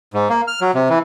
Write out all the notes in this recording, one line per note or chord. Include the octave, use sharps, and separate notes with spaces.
G#2
A#3
F6
F#3
C3
E3